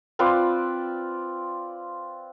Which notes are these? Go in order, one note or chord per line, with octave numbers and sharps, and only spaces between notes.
C4 F4 B4 D5